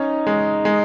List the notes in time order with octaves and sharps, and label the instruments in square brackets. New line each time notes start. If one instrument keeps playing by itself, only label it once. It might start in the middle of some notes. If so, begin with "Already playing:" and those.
Already playing: [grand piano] C#4 [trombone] D#4
[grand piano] G#3
G#3